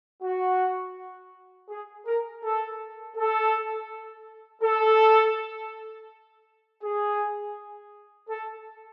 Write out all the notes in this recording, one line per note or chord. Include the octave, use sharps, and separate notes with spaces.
F#4
G#4
A#4
A4
A4
A4
G#4
A4